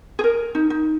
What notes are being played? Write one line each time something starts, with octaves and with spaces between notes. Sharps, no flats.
G#4
A#4
D#4
D#4